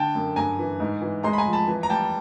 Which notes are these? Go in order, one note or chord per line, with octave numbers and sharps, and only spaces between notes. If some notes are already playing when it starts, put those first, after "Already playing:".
Already playing: D3 G5 A5
F#2
G2 G#5 A#5
E3
G#2
E3
G#3 A#5 C6
B5
G#5 A#5
F3
A5 B5
E3
A#5
G3 G5 A5